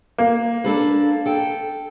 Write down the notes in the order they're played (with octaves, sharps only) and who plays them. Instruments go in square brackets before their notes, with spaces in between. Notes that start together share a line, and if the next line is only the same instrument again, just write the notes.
[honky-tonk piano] A#3
[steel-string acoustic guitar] D4 A4 B4
A4 G5